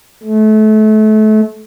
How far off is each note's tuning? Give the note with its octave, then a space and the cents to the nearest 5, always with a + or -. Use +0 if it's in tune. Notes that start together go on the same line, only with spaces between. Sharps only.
A3 -30